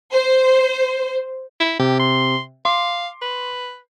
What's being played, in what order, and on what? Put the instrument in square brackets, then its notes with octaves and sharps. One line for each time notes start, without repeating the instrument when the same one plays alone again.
[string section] C5
[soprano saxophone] E4
[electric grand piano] C3 [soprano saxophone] G4
[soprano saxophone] C6
[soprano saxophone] F5 [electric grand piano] C6 D6
[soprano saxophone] B4